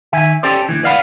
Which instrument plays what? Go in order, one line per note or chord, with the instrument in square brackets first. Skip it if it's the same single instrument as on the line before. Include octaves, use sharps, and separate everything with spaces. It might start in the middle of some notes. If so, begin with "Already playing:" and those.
[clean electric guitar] D#3 E5 G#5
C#4 G4 A4 C5 D5
D2 E3
B4 D5 F5 F#5 B5